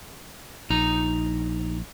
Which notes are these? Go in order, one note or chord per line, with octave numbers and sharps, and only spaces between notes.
A#1 D#4 A#5